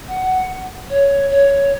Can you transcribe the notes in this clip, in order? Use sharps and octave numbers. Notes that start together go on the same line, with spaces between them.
F#5
C#5
C#5